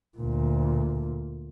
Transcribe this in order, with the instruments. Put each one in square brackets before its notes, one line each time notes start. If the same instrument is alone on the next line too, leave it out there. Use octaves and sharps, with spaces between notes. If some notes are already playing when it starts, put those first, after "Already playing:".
[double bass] D2 A#2